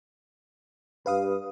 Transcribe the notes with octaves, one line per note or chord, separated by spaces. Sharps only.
G2 B4 F5 D#6